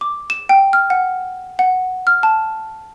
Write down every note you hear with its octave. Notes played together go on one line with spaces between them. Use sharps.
D6
E7
G5
F6
F#5
F#5
F6
A5